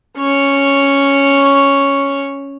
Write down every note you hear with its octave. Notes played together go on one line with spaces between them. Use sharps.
C#4 C#5